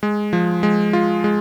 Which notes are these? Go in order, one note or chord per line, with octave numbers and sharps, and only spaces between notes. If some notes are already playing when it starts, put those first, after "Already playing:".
G#3
F3
G#3
F4
G#3